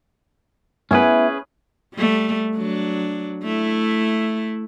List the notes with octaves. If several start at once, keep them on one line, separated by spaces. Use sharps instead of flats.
B3 C#4 E4 G#4 B4
G3 A3
F#3 D4
A3 E4